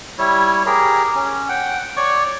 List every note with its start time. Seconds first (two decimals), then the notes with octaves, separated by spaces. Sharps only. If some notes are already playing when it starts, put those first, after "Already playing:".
0.19 G3 E4 C#5
0.66 G4 G#4 A#4
1.15 C#4
1.49 F#5 G5
1.97 C#5 D5 C#6